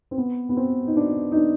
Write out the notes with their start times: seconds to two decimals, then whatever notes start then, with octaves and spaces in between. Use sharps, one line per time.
0.11 C4
0.18 B3
0.49 B3
0.57 C4
0.87 D#4
0.96 D4
1.32 D#4
1.36 D4